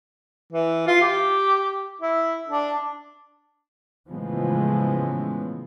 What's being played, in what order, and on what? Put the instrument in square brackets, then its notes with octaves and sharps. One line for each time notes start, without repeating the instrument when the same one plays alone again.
[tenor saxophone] E3
F4
G4
E4
D4
[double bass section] A2 C#3 E3 F3 G#3 B3